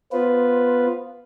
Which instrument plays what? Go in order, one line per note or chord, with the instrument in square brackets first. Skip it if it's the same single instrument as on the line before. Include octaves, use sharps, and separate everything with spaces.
[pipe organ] B3 F4 B4 [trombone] C5